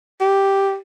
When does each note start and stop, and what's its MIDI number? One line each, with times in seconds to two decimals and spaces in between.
0.21 0.76 67